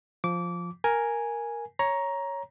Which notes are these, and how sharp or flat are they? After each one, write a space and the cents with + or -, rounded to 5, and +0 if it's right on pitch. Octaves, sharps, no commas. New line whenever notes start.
F3 +0 D6 -20
A#4 +0 G#5 +0
C#5 +0 A#5 +15